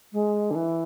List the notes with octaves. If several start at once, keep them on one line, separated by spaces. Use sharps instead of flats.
G#3
D3
E3